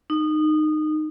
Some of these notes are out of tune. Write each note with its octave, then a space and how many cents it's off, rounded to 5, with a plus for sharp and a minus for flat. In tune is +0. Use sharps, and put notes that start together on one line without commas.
D#4 -20